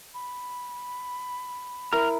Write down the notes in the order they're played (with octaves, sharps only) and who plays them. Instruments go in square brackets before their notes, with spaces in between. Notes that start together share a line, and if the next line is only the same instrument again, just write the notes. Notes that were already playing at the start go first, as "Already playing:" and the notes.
[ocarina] B5
[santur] E4 A#4 [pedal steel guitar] A#5 F6